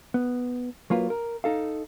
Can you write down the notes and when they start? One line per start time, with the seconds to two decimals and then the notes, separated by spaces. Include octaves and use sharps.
0.14 B3
0.90 F#3 A#3 F4 B4
1.10 A#4
1.44 D#4 A4 F5